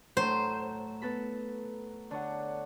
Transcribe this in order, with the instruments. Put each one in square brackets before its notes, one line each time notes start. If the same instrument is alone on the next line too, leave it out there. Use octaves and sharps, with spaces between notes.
[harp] A2 A3 [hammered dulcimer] F#3 [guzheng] C5
[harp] B3 A4 B5
[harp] D3 [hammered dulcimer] D4 C#5 F#5